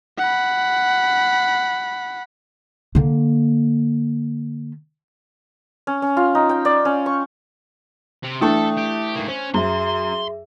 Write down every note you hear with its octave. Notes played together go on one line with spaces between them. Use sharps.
F#5 B5
D3 A#3
C#4
C#4
F4
D#4
G5
D5
C#4
C#6
C3
E3 A3 D4 A4 E5 G5 D#6
G4
G#2 A#3
C#4 C5
F#2 G#4 E5 C6